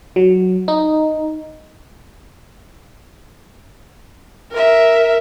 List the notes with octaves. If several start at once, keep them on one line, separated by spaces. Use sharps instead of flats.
F#3
D#4
A#4 E5